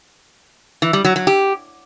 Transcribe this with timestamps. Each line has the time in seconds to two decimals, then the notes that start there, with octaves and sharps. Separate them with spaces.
0.82 E3
0.93 G3
1.05 F#3
1.16 F#3
1.27 G4